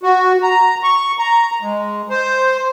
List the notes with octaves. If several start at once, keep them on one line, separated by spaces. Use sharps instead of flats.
F#4
A#5
C#6
A#5
G#3
C5